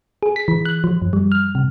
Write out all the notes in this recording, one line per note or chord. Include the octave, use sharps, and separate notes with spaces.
G#4
B6
E3
F#6
F3
F#2
G3
F6
C3